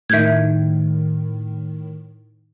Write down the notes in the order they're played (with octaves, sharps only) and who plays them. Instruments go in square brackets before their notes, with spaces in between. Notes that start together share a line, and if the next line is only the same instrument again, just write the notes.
[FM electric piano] A2 D#3 [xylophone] E5 G6 G#6